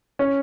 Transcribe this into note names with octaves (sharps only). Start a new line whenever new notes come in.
C#4